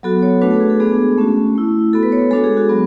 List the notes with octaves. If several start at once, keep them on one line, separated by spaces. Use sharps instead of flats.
F#3 B3 F#4 A4
C#5
A3 D4 F#4 B4
A4
G#4
A4
G#3 B3 D4 G#4
A3 C#4 F#4
A3 E4
B3 F#4 A4
B4
C#5
G#3 D4 F#4 A4
G#4
F#4
F#3 B3 F#4